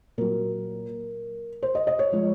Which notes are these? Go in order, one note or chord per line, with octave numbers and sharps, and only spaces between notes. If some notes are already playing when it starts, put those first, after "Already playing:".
A#2 F#3 A#4
C5
D#5
D#5
C#5
F3 G#3